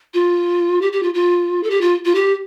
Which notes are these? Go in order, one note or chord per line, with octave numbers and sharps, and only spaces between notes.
F4
G4
G4
F4
F4
A4
G4
F4
F4
G4